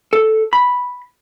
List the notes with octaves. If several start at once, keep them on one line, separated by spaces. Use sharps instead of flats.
A4
B5